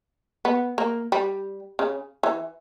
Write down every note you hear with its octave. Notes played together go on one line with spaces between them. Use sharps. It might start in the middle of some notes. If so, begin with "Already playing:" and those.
B3
A#3
G3
C#3
E3